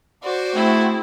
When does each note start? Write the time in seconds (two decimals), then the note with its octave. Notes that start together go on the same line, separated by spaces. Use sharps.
0.23 F#4 C5 D5 D6
0.55 A3 C4 E4 G#4